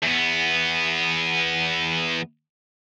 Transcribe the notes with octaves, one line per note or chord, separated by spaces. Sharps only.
E2 B3